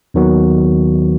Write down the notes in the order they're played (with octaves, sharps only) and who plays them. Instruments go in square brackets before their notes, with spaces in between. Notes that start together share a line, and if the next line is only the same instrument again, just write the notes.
[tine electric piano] D#2 D#3 F#3 B3 F#4